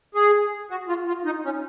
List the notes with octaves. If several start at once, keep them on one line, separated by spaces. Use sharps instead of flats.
G#4
F#4
F4
F4
D#4
C#4